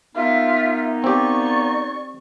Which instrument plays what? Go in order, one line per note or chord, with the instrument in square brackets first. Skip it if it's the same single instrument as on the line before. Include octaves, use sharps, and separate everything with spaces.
[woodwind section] A#3 B3 D#4 [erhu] F4 [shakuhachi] E5
[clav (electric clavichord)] C4 G4 [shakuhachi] D5 [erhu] C#6